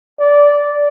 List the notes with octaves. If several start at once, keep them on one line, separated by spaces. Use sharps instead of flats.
D5